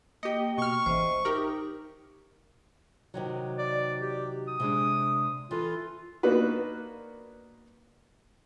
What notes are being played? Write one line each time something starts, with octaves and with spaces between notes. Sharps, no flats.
A#3 G4 D#5 G5
B2 C#6 F6
A1 C5 D#5 E5
D#4 G4 A#4
C3 D#3 F#3
D5
G4
D#6
C3 G#3 D4
E3 F4 A4
A#3 B3 D4 D#4 F#4 B4